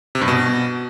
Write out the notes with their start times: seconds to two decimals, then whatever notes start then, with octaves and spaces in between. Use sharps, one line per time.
0.15 C3
0.21 G2
0.28 B2